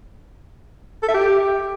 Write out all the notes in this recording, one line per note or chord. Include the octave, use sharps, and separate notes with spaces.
A4
E5
G4